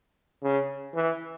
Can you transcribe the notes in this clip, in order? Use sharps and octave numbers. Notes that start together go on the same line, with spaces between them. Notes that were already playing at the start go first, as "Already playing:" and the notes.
C#3
E3